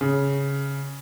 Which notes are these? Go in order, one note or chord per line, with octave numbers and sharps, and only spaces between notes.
C#3